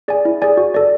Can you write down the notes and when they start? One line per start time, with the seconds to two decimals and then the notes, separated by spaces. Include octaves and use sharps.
0.08 G#4 D5 G#5
0.25 E4
0.42 G#4 D5 G#5
0.57 F#4
0.74 A4 D5